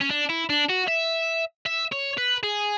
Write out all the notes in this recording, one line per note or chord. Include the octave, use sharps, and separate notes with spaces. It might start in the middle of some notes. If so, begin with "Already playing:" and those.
C#4
D4
E4
D4
F#4
E5
E5
C#5
B4
G#4